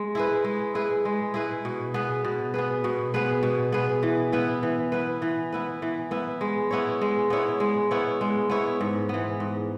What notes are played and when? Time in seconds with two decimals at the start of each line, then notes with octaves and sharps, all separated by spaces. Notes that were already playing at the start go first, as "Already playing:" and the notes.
Already playing: G#3
0.15 E4 G#4 B4
0.44 G#3
0.75 E4 G#4 B4
1.05 G#3
1.34 E4 G#4 B4
1.65 B2
1.94 B3 G#4 B4
2.25 B2
2.54 B3 G#4 B4
2.84 B2
3.14 B3 G#4 B4
3.43 B2
3.72 B3 G#4 B4
4.03 E3
4.32 B3 E4 B4
4.63 E3
4.92 B3 E4 B4
5.22 E3
5.52 B3 E4 B4
5.82 E3
6.11 B3 E4 B4
6.41 G#3
6.71 B3 E4 C#5
7.02 G#3
7.30 B3 E4 C#5
7.60 G#3
7.91 B3 E4 C#5
8.21 G#3
8.50 B3 E4 C#5
8.81 G#2
9.09 E3 B3
9.40 G#2